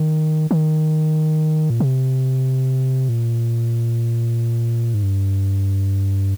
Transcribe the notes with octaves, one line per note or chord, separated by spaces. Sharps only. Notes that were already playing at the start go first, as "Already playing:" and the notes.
Already playing: D#3
D#3
A#2
C3
A#2
G#2
G2